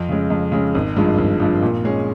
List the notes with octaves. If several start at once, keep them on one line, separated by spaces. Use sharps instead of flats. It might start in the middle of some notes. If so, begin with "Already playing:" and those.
Already playing: F2
C#3 G#3
F2
C#3 G#3
G#1
G2 F3 G#3
G#1
G2 F3 G#3
A#2
G#3 C#4 G#4